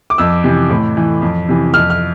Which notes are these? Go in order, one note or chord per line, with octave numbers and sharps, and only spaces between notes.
D6
F2 E6
C3 E3
A2
E3
F2
C3 E3
F2 F6
F6